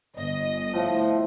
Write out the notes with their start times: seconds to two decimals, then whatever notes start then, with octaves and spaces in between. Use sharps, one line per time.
0.16 G1 D#5
0.73 A2 F3 F4